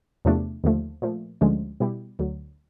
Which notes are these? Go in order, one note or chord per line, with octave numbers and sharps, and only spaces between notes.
E2 C3 F3 A3 D4
D#2 D3 F3 A3
A#2 F3 A3
D2 D3 F3 G#3 C#4
B2 G3 B3 E4 G4
D2 D3 F#3